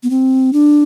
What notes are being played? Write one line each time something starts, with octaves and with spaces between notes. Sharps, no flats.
B3
C4
D4